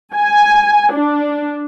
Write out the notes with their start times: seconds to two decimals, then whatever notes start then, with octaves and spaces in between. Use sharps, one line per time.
0.16 G#5
0.93 D4